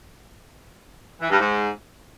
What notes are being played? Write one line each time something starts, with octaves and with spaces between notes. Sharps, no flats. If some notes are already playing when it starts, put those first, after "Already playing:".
E3
G2
G#2